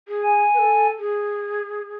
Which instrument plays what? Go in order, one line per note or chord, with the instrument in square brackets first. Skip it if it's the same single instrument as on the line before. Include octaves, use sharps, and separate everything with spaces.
[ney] G#4
[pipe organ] G#5
[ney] B4
A4
G#4